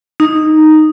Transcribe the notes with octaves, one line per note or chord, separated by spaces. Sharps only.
D#4